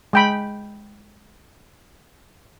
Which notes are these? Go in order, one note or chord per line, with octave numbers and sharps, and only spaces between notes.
G#3 G5 B5